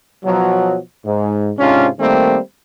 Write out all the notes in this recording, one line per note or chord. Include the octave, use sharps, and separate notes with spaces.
B2 F3 F#3
G#2
G#2 C3 C#4 D4 F4
D#3 G3 A3 A#3 C4